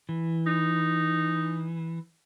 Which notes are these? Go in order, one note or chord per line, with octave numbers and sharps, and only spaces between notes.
E3
D#4